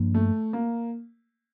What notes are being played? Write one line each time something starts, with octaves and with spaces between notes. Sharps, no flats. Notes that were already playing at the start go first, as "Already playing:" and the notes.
Already playing: G2 F3 A#3 D4
A3
A#3